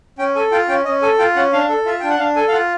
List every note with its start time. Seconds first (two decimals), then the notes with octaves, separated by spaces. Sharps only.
0.18 C#4 G5
0.36 A4 G#5
0.52 F4 G5
0.68 C#4 G5
0.85 C#4 D#5
1.02 A4 G#5
1.19 F4 G5
1.36 C#4 F#5
1.53 D4 F5
1.69 A4
1.86 F4 E5
2.00 D4 G5
2.10 F#5
2.19 D4 F5
2.36 A4 G#5
2.48 F5
2.52 F4 F#5